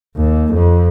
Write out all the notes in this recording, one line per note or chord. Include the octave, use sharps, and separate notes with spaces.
D#2
F2